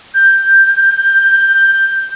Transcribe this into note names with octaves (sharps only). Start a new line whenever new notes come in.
G6